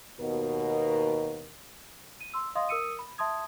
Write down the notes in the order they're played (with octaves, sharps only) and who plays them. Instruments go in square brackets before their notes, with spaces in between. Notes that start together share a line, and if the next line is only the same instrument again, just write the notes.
[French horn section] D#2 B2 A#4
[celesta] D#7
C6 E6
D#5 F5 C6 D#6
A#4 D#6 E6 C#7 D#7
B5
E5 A5 C6 D#6 G#6